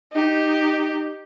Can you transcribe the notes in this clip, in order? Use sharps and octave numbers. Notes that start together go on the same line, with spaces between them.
D#4 G4